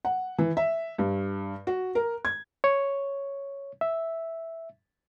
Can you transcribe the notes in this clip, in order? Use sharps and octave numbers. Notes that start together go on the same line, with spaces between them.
F#5
E3
E5
G2
F#4
A#4
G#6
C#5
E5